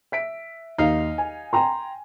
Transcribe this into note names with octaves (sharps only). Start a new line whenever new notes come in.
E5 B6 D7
D#2 D#4 F5
G#5
G5 A#5 C6